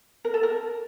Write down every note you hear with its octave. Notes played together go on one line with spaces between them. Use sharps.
A#4
A4
A#4